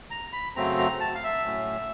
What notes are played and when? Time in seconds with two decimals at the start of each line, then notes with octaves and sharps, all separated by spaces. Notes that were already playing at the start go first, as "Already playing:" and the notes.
0.11 A#5
0.33 B5
0.56 F#2 C#3 F#3 A3 C4 A#5
0.78 A#5
1.00 A5
1.15 F5
1.24 E5
1.46 A2 F#3 A3 C#4